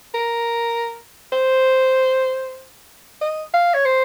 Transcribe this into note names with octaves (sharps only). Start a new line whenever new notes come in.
A#4
C5
D#5
F5
C#5
C5